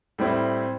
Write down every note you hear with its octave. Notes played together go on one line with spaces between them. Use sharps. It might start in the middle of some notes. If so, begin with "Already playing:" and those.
A2 G3 C4 E4